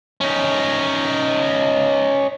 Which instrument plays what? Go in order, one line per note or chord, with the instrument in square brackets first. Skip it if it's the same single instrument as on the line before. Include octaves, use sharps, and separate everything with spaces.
[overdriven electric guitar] C#4 D#4